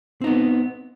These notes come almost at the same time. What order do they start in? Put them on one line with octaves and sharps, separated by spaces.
C4 D#4 B3